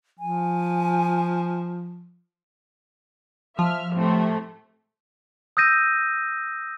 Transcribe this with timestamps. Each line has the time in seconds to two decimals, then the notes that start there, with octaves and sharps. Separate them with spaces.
0.19 F3 G#5
3.59 F3 E5 F6
3.93 A2 C3 A3
5.57 D#6 E6 G6 A#6 D#7